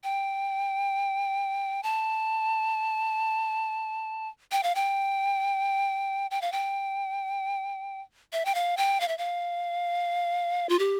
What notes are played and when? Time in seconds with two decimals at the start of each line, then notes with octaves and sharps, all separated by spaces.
0.04 G5
1.83 A5
4.52 G5
4.63 F5
4.75 G5
6.31 G5
6.42 F5
6.52 G5
8.33 E5
8.45 G5
8.55 F5
8.77 G5
9.00 F5
9.08 E5
9.18 F5
10.69 F4
10.79 G4